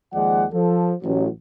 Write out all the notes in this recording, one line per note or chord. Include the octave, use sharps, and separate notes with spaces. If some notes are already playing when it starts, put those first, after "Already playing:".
D#2 F3 G#3 D5 F#5
F3 A4
A1 F#3